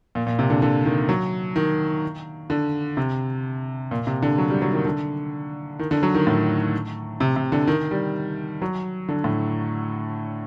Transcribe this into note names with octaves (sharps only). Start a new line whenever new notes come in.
A#2
A#2
C3
D3
D3
D#3
F#3
D#3
D3
C3
A#2
C3
D3
F#3
G3
F#3
D#3
D3
D#3
D3
F#3
D#3
A2
C3
C3
D3
D#3
G3
F#3
D3
A2